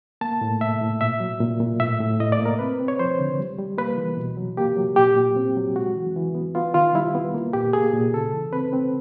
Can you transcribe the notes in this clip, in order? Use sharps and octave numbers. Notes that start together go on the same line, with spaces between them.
A#3 A5
A2
A2 E5
A2
A#2 E5
F#3
A#2
A#2
A2 E5
A2
A2 D#5
D5
A#3
A#4
C4 B4
C4
C#5
F3 C5
D3
G3
G3
A#3 B4
E3
B2
F#3
A#3 G4
F#3
A#2 G4
A#2
C4
F#3
G#3 F#4
E3
E3
B3
B3 F4
D#3 F4
G3 E4
B3
A#3
A#2 G4
A#3 G#4
A#2
C#3 A4
E3
C4 B4
C4